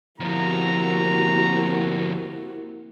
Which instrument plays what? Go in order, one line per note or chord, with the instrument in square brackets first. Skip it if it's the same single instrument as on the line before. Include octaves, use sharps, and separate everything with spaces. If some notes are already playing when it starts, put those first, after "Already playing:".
[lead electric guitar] D2 F3 [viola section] A#3 C4 F#4 [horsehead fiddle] E4 G4 [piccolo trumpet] A#5